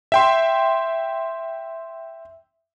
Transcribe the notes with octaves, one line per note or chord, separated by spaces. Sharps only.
E5 G5 C6